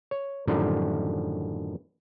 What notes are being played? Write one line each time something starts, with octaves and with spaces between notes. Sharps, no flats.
C#5
F#2 A2 D3 D#3 F3 G3